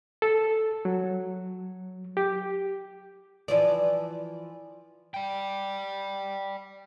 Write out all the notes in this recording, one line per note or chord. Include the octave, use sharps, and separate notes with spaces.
A4
F#3
G4
E3 F3 D5
D5 G5